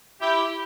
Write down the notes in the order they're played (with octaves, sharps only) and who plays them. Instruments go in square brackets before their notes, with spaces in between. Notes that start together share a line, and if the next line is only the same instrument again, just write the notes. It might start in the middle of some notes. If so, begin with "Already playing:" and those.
[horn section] E4 G4